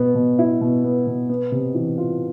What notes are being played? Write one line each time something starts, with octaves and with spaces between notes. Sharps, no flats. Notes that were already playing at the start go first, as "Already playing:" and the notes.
Already playing: B2 B3
B2
E4
B2
B3
B2
B3
C3
E3
F4